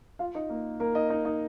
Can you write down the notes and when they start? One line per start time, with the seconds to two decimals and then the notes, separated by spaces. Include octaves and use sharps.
0.19 F4 F5
0.35 D#4 D#5
0.49 A#3 A#4
0.80 A#3 A#4
0.95 D#4 D#5
1.09 D#4 D#5
1.25 D#4 D#5